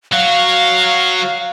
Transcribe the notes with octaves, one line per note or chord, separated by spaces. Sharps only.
F#3 F#4 F5